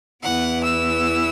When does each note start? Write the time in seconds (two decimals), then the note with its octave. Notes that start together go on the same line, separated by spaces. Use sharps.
0.22 E2 E3 B3 F#5
0.64 E6